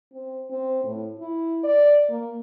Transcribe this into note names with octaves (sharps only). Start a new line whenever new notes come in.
C4
C4
A2
E4
D5
A#3